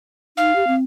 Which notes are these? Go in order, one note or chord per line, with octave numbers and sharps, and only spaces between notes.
D#4 F5
G4
C4